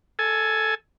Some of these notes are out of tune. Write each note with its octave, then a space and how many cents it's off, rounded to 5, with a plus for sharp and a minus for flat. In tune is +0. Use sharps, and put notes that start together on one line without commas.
A4 +0 G#5 +15